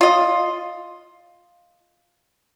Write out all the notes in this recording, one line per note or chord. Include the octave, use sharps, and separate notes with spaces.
F4 D#5